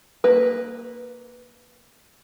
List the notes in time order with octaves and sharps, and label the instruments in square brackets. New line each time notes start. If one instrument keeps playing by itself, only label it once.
[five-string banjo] A#3 B4